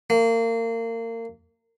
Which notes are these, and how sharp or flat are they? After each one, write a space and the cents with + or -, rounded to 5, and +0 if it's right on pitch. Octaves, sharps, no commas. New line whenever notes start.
A#3 -30